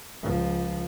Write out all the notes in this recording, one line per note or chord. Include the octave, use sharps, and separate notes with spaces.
C#2 F3